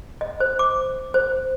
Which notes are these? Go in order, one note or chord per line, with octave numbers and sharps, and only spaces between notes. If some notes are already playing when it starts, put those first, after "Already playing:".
D#5
C5
D6
C5